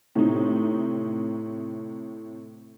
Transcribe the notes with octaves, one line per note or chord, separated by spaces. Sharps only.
A2 C3 D#4